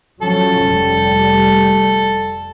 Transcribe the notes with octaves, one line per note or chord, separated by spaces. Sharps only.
F3 F#3 C#4 A4
F1 G3